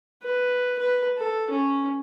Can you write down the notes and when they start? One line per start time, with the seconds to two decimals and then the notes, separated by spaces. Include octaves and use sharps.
0.22 B4
0.79 B4
1.17 A4
1.50 C#4